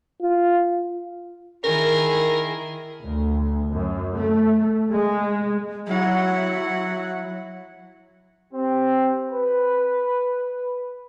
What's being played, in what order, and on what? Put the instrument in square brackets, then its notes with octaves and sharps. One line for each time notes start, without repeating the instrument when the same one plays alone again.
[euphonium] F4
[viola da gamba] D#3 E4 G#4 [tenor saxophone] A#4
[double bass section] D2
F#2
A3
G#3
[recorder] F#3 [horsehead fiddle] E4 F#5
[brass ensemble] C4 G4
B4